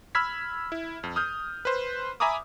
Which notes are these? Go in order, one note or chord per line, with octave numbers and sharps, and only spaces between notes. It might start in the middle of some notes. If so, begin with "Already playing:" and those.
B5 E6 F6 G#6 B6
E4
F2
D#6 F6 G6
B4 C5
E5 G#5 A#5 B5 D6 D#6